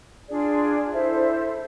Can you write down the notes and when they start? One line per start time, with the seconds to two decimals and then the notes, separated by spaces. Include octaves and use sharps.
0.28 D4 F4 G#4 D5
0.92 E4 A4 C5 E5